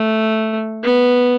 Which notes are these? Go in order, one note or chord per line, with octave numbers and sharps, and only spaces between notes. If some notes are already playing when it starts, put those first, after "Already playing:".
Already playing: A3
B3